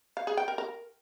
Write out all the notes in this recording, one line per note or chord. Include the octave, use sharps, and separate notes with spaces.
F5
G#4
G5
A#4
A#4